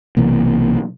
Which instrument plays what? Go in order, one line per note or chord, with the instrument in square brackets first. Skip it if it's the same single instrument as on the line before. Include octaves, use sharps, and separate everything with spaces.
[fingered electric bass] B1 C3 E3 A#3